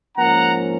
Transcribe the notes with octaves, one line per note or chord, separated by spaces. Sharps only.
G#2 F3 A#3 C#4 F#5 A#5